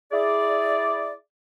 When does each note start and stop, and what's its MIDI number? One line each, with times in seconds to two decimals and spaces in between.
0.12 1.13 64
0.12 1.13 68
0.12 1.13 74